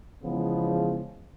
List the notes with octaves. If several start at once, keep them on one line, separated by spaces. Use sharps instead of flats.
E2 C#3 F3 G#3 B3